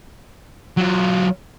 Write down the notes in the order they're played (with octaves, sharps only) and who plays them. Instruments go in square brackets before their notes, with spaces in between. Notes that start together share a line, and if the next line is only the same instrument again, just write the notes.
[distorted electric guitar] F#3 F4